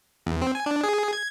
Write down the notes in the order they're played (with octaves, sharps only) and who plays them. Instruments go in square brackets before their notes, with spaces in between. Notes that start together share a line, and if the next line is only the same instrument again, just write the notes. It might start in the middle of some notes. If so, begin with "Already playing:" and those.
[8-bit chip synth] E2
C4
G#5
D4
G#4
G#6